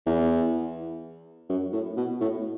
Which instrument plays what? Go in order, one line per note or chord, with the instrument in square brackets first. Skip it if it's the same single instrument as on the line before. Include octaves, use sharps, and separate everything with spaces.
[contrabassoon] E2
F#2
A2
B2
A2